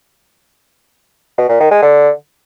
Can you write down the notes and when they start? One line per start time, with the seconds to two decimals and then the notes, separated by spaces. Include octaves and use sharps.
1.38 B2
1.49 A#2
1.60 D#3
1.71 G#3
1.82 D3